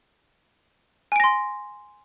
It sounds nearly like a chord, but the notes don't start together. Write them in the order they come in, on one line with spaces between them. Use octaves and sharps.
G#5 D7 A#6 C6